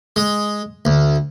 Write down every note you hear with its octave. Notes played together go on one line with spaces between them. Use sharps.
G#3
D2